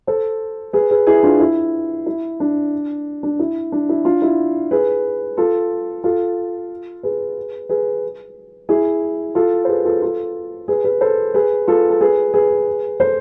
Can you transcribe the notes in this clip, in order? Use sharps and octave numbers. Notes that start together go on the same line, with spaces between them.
A4 C5
G#4 B4
G#4 B4
E4 G#4
D4 F4
E4
E4
D4
D4
E4
D4
E4
D4 F4
E4
G#4 B4
F4 A4
F4 A4
G#4 B4
G#4 B4
E4 G#4
F4 A4
C5
G#4 B4
F4 A4
F4 A4
G#4 B4
G#4 B4
A4 C5
G#4 B4
F4 A4
A4
G#4 B4
G#4 B4
A4 C5